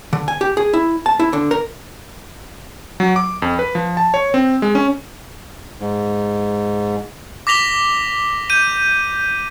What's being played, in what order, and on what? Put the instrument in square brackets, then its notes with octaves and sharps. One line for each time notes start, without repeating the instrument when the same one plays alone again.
[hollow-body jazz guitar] D3
G#5
G4
G#4
E4
A5
E4
D3
A#4
[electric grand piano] F#3
D6
F2
B4
F3
A5
C#5
C4
G#3
C#4
[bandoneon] G#2
[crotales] D6 A#6 B6 F7 G7
G6 D#7